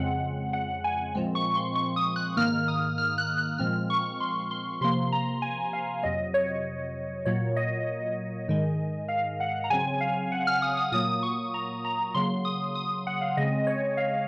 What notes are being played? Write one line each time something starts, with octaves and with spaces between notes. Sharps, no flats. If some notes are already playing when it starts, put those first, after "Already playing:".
Already playing: F2 C#3 G#3 C4 F#5
F#5
G#5
A#2 F3 G#3 C4
C#6
C6
C#6
D#6
F#6
G#2 D#3 A#3 F6
D#6
F6
F#6
F#6
A#2 F3 G#3 C4 F6
C#6
C6
C6
C3 F3 A#3 C6
A#5
G#5
F5
F2 C3 F#3 D#5
C#5
A#2 F#3 A#3 C#5
D#5
G#2 D#3 G#3
F5
F#5
A#5
C#3 F#3 C4 G#5
F5
F#5
F6
D#6
D#6
A#2 F#3 A#3 D#6
C#6
A#5
A#5
C#3 F#3 A#3 C6
D#6
D#6
F#5
F5
C#3 G#3 C4 D#5
C#5
F5